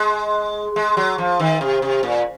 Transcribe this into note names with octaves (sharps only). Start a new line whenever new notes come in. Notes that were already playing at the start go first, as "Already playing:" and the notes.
Already playing: G#3
G#3
F#3
F3
D#3
C3
C3
A#2